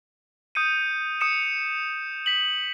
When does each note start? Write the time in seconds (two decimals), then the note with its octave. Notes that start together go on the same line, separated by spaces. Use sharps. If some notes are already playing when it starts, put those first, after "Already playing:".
0.55 D#6 G6 C#7 D#7
1.21 D#6 C#7 E7
2.26 B6 F#7